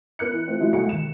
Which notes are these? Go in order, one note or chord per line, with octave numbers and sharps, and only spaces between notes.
B3 A#4 F#6 C#7
E3
A3 C4 F4
F#3 G#3 A3 E4
C2 B2 G#3 A3 G#4 C#7
D#2 E7